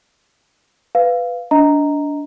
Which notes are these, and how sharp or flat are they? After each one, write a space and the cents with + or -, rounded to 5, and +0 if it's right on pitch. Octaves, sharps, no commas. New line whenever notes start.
B4 +10 F5 -5
D4 -20 D#5 +20 A#5 -5